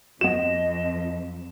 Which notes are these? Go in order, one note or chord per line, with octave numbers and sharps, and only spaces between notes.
F2 B3 F#4 D#5 E7